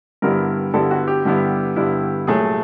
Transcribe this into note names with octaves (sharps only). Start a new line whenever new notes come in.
G2 D3 G3 B3 E4 A#4
G2 D3 G3 B3 E4 A4
F#4
G4
G2 D3 G3 B3 E4
G2 D3 G3 B3 E4
C2 A#2 F#3 A3 G#4